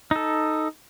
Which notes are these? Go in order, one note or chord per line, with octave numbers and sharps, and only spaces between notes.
D#4 A4